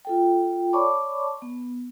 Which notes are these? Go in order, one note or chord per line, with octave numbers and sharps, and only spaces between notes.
F4 A4 G5
C#5 D5 A5 B5 C#6 D6
B3